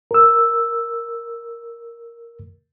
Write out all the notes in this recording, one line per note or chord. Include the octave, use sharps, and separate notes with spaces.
A#4 E6